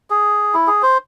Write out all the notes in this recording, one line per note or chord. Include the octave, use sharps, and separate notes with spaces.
G#4
E4
G#4
C5